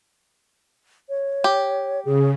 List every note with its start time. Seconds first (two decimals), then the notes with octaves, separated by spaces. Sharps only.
1.09 C#5
1.44 G4
2.05 C#3 G#4